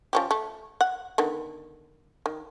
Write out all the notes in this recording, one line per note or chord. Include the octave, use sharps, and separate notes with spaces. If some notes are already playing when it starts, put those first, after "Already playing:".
F3 C#4 G4
A3
F#5
D3 D#3 B3
D#3